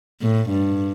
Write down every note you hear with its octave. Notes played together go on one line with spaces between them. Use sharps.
A2
G2